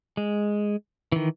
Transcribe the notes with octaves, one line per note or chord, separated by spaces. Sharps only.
G#3
D#3 E3